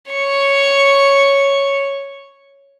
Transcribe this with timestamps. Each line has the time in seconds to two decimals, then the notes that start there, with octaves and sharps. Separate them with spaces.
0.12 C#5 C#6